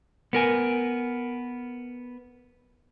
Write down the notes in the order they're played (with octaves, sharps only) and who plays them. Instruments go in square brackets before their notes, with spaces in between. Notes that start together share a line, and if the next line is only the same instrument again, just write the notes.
[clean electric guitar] B3 A#4 G#5